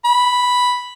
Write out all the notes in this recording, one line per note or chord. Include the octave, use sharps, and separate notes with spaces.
B5